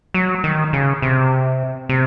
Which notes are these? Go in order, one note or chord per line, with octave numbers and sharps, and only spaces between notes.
F#3
D#3
C#3
C3
C3